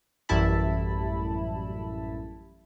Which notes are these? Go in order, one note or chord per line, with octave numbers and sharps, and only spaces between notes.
A1 F#2 G3 E4 A5 B5